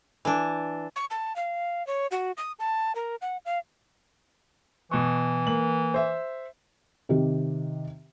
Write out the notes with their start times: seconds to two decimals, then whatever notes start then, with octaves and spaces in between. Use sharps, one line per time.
0.25 E3 D4
0.96 C#6
1.11 A5
1.36 F5
1.87 C#5
2.11 F#4
2.37 D#6
2.59 A5
2.95 A#4
3.22 F#5
3.45 F5
4.91 B2 E3 C#6
5.47 A#3 F#7
5.94 C5 E5
7.09 C3 D#3 G4